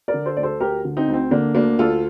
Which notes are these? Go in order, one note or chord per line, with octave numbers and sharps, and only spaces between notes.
A#4 D5
D3
A4 C5
D2 D5
A4 C5
D2 G4 A#4
D3
C4 D#4
D2
C4
D3 A#3 D4
D2 A#3 D4
D2 F4 A4